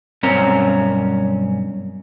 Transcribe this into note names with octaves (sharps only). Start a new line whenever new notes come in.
B1 G2 C4 C#4 A#4